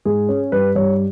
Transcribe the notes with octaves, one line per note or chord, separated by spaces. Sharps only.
G#2 G#4
C#4
G2 B4
G2 C#5